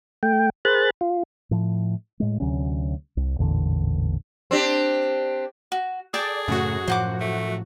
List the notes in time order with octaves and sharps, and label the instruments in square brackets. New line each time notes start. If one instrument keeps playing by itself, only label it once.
[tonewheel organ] A3 G5
G#4 A#4 C5 B5 F#6 A6
F4
[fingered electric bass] A2 F3
A2 G#3
D2 C3 F#3 C#4
C2
A1 E2 A#2 D3
[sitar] C4 D4 G4
[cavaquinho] F#4
[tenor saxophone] G#4 [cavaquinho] A4 G5 A5 [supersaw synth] D5
[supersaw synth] F#2 F#4 [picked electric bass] A2 C#3 A3
[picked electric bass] A2 F3 [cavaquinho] C5 F#5 D6
[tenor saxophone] A3